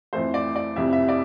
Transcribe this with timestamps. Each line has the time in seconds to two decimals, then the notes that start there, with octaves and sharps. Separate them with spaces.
0.13 F2 E3 A3 C5
0.34 D5
0.56 D5
0.76 F2 C3 E3 G3 E5
0.93 E5
1.08 D5